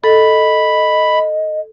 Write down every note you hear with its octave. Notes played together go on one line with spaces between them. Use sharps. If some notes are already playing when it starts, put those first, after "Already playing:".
A4 D#5 B5